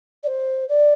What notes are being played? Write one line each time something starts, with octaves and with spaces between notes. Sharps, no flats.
D5
C5
D5